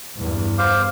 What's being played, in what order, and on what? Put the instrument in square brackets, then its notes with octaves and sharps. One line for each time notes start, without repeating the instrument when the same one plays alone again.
[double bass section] E2 G2
[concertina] C5 F5 D6